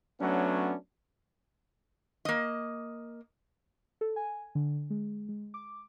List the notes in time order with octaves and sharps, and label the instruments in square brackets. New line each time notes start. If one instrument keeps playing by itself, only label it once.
[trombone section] F#3 A3 B3 C#4 D4
[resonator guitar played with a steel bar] A#3 D#5
[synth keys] A4
G#5
D3
G#3
G#3
D6